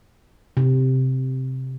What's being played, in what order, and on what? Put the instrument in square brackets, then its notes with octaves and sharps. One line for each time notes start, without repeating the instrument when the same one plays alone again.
[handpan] C3